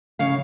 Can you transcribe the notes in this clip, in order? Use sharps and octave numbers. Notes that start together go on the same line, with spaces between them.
C#3 C#5 F5